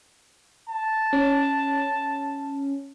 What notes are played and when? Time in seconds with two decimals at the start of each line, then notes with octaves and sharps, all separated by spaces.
0.70 A5
1.13 C#4